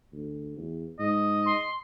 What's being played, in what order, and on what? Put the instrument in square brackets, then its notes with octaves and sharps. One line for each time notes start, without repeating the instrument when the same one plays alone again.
[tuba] D2
E2
[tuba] G#2 [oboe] D#5
[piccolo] C6